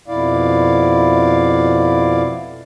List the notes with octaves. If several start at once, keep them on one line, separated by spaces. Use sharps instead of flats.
F2 B2 E4 D5 F5